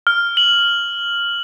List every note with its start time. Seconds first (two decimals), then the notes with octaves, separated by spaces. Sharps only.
0.07 F6
0.37 F#7